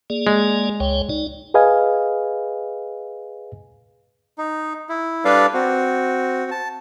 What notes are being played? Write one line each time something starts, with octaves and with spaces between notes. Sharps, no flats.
A#3 G#4 D5
G#3
C#2 C#5 G5
D#4 D5
G#4 B4 D#5 F5 G#5
D#4
E4
G3 D4 A4 B4 D5 F5
C4 F#4
A5